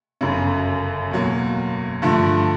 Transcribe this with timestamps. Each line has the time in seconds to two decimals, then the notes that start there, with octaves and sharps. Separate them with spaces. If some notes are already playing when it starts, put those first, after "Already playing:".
0.21 G1 F#2 C#3
1.11 E2 B2 F#3 A#3
2.02 G2 D3 F3 A3